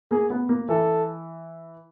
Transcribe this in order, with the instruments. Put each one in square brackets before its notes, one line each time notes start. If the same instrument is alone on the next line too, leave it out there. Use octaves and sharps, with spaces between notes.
[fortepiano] A#3 [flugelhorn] G#4
[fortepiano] B3
A#3
[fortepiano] E3 [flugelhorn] A4